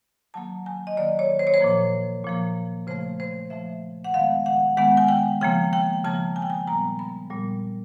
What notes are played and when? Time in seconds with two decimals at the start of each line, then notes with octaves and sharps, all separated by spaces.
0.34 D#3 F#3 A#3 A5
0.66 G#5
0.87 D#5
0.97 D#3 F#3 A#3 D5
1.19 C#5
1.39 C5
1.47 C#5
1.54 C5
1.61 A#2 F3 A#3
2.24 A#2 F3 A#3
2.87 C#3 F3 A3 C5
3.20 C5
3.50 C#3 F3 A3 E5
4.04 F#5
4.14 D#3 G#3 B3 F5
4.46 F#5
4.77 D#3 G#3 B3 F#5
4.97 G#5
5.08 G5
5.41 C#3 F3 A#3 G5
5.73 G5
6.05 C#3 F3 A#3 A5
6.36 G#5
6.42 G5
6.50 G#5
6.67 A#2 G3 B3 A#5
6.99 B5
7.30 A#2 G3 B3